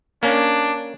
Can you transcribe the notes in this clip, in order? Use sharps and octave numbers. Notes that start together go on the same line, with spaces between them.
A#3 C#4 D4